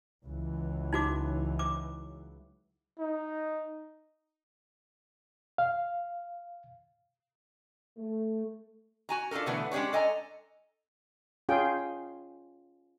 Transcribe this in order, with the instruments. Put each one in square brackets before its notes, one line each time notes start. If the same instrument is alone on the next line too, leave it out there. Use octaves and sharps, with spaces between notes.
[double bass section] C#2 E3 F#3
[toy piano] D#4 F#4 D6
D6
[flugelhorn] D#4
[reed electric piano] F5
[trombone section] A3
[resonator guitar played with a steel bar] F#4 G#5 A#5
D4 F4 F#4 A4 A#4
B2 D3 E3 A3 B3
G#3 C#4 D4 G4 C#5
A4 D#5 G#5 A#5
[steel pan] C#4 F4 G#4 G5